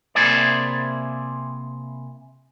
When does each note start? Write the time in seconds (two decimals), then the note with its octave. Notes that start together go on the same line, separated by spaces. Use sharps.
0.15 C3 A#3 E4 G#4 C5 D5